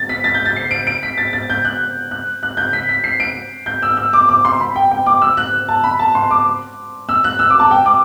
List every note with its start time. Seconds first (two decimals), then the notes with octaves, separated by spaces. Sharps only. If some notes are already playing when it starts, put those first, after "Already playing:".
Already playing: A6
0.09 B6
0.24 A6
0.34 G6
0.45 A6
0.56 C7
0.71 D7
0.87 D7
1.03 B6
1.18 A6
1.33 A6
1.50 G6
1.65 F#6
2.11 F#6
2.43 F#6
2.57 G6
2.73 B6
2.89 B6
3.04 C7
3.20 D7
3.66 G6
3.82 E6
3.97 E6
4.13 D6
4.29 D6
4.45 C6
4.60 B5
4.76 G5
4.91 G5
5.06 D6
5.22 E6
5.37 F#6
5.68 A5
5.84 B5
5.99 A5
6.15 C6
6.31 D6
7.09 E6
7.24 F#6
7.39 E6
7.50 D6
7.59 A5
7.71 G5
7.86 D6